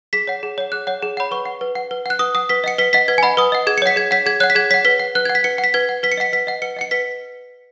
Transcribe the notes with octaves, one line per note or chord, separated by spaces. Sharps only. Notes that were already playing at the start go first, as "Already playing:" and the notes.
G#4 B6
C#5 F#5
G#4
C#5 F#5
G#4 F#6
C#5 F#5
G#4
C#5 F#5 B5
B4 C#6
F#5
B4
F#5
B4
F#5 F#6
B4 D#6
F#5 D#6
B4 B6
D#5 F#5 C#7
B4 B6
D#5 F#5 B6
B4 G#6
G#5
D#5 F#5 B5
B4 D#6
D#5 F#5
G#4 G#6
C#7
C#5 F#5 B6
G#4 G#6
C#5 F#5 B6
G#4 G#6
C#5 F#5 F#6
B6
G#4 G#6
C#5 F#5 B6
B4 B6
F#5
B4 F#6
F#5 G#6
B6
B4 C#7
F#5
B6
B4 G#6
F#5
B4 B6
C#7
D#5 F#5 B6
B4 B6
D#5 F#5
B4 C#7
D#5 F#5 C#7
B4 B6